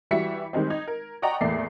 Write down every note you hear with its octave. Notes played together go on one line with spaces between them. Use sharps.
E3 G3 F#4 E5 B6 C#7
D#3 G3 G#3 C4
D#4 G#6
A#4
D5 D#5 F#5 G5 A#5 C#6
E2 A2 A3 A#3 D5 C7